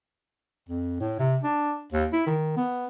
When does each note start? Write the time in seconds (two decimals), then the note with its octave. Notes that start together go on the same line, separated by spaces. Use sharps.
0.69 F2
1.00 A2
1.19 C3
1.43 D4
1.92 D#2
2.13 E4
2.26 D#3
2.57 B3